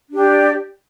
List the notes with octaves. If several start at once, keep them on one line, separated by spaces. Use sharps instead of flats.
D4 G4 D5